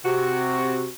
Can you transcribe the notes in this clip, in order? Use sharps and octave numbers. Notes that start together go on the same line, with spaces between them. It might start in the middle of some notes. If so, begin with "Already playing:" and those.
C3 F#4